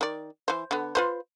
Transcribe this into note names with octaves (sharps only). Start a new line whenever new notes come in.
D#3 D5
E3 C5
D3 B3
F4 B4 C5